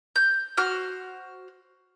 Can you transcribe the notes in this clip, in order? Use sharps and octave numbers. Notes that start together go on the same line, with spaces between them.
G6
F#4 C5 F6